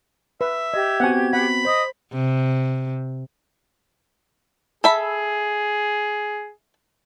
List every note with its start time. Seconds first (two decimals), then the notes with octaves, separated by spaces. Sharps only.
0.41 B4 E5
0.74 G4 D#5 G#6
1.00 B3 C4 F#4 F#5 G#5
1.33 F#5 B5
1.65 C5 D#5 D#6
2.13 C3
4.84 G#4 A4 E5 B5